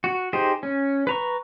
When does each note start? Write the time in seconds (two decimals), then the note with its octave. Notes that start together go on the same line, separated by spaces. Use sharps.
0.04 F#4
0.33 D#4 G4 G#4 C5
0.63 C#4
1.07 B4 A#5 C#6